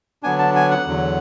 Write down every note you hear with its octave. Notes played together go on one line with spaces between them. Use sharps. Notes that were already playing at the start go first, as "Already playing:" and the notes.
D3 F#3 B3 D4 G#5
A5
G#5
F#5
E2 D3 F#3